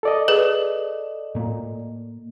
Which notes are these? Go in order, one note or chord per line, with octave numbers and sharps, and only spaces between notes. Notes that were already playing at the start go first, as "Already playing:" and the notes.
A4 D5 D#5
G#4 B4
A2 A#3